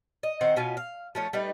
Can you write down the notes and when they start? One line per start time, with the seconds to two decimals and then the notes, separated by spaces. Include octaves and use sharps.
0.23 D#5
0.41 D#3 C4 C5 F#5
0.56 B2 C#4 F4 G#5
0.77 F5
1.15 F3 A3 C#4
1.33 G3 A3 D#4 B4